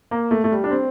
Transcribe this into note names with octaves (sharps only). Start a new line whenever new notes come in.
A#3
A3
A3
G3
D4
C4